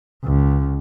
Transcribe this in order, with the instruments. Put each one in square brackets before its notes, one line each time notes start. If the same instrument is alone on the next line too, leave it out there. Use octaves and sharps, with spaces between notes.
[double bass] C#2